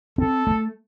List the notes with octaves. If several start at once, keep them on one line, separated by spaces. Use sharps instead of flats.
C4 A4
A3